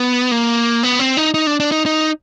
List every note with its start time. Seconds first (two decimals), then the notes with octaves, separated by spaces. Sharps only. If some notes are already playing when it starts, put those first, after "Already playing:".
Already playing: B3
0.31 A#3
0.83 B3
0.99 C4
1.17 D#4
1.34 D#4
1.47 D4
1.60 D4
1.72 D#4
1.86 D#4